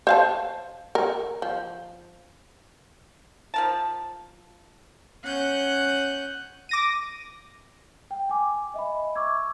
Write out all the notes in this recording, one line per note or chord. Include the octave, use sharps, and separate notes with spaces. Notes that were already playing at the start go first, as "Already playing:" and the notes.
C5 F5 A5
A#4
F3
F3 A#4 A5
C#4 F#5 F#6 G6
D6 A#6 D#7
G5
G#5 D6
D#5 E5 G#5 B5
C#6 D6 E6 G#6